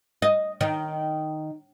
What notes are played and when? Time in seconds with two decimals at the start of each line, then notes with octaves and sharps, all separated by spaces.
0.22 D#5
0.61 D#3